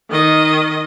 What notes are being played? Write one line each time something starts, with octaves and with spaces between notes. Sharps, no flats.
D#3 D#5